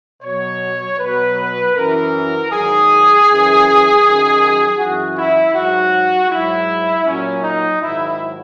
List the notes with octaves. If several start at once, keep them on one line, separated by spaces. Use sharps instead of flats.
B2 F#3 C#5
B2 F#3 B4
F#2 E3 A#4
G#2 D#3 F#3 G#4
F#2 E3
F#2 D#3 F#3
F#2 E3 F#4
E4
G#2 F#3 F#4
G#2 F#3 E4
A#2 F#3 C#4
D#4
G#2 D#3 F#3 E4